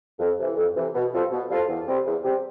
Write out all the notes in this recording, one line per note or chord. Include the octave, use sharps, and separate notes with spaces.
F2
C3 E3
F2
C3 E3
B2
G3 C4 F4 A4
B2
G3 C4 F4 A4
E2
C3 G3 C4 G4
E2
C3 G3 C4 G4